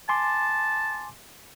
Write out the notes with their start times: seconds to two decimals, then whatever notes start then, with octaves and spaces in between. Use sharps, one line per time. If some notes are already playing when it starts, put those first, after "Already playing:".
0.09 G#5 A5 C6 D6